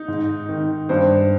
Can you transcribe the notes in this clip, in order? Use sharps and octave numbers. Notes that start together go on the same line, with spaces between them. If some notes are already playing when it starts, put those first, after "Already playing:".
Already playing: D#4
G#2
D#3
G2 C5